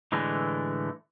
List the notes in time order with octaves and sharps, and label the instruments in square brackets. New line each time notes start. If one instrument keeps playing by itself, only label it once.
[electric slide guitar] A2 D3 E3 G#3 A3